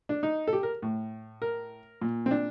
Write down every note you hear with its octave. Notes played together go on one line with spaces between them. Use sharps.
D4
D#4
A4
G4
A#4
A2
A#4
A#2
C4
D4